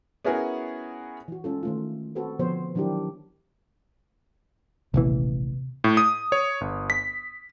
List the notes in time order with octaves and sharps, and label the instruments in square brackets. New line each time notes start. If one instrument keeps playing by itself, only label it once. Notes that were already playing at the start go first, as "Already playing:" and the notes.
[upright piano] B3 C#4 E4 F#4 G#4 A#4
[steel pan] E3 F#4
G#3 C#4 F4 A4
D#3 A3 F4
C4 F#4 A4 B4 C5
D3 F3 B3 F#4 C5 C#5
D#3 F#3 D4 E4 G4 A#4
[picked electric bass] D#1 A1 E3 [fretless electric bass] C3 B3
[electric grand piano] A2
D#6
C#5
G1
B6